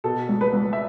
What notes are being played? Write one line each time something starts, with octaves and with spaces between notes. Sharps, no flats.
B2 A4
C#2
B4
C#2
E5